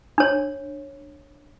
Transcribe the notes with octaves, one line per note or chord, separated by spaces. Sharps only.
D4 C#5